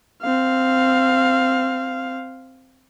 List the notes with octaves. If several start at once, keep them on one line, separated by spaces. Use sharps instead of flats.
C4 F5